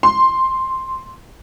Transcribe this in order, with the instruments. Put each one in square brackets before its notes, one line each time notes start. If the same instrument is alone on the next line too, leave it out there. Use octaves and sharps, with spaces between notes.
[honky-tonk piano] C6